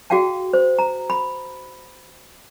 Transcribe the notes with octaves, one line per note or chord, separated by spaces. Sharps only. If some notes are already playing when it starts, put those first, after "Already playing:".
F#4 G#4 F5 G5 A5
C5
A#5
B5